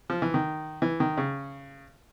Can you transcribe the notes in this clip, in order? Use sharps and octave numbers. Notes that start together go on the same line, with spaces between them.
F3
E3
D#3
E3
D#3
C#3